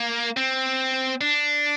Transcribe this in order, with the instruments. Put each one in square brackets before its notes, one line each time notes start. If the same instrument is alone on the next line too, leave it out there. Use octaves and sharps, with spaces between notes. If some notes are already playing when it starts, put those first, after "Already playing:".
Already playing: [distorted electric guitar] A#3
C4
D4